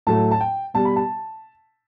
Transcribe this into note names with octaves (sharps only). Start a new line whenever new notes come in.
A2 F#3 A3 A5
A5
G5
B2 G3 A5
B5
A5